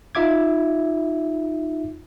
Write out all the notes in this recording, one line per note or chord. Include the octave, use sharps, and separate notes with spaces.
D#4 F4 E5 D6 G#6